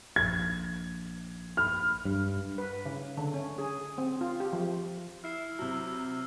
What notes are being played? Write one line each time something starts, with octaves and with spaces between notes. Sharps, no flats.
A#1 G#6
B5 F6
G2
B4
C#3
D3
C#4
G#4
C4
F4
G4
F3
E4 F6 C7
C3 F#3 E6